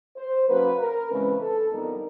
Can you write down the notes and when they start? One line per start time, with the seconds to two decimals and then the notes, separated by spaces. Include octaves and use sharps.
0.17 C5
0.48 C#3 F#3 A#3 C#4 B4
0.79 A#4
1.09 C#3 E3 G#3 C4 B4
1.41 A4
1.71 F2 D3 G3 B3 D#4 A#4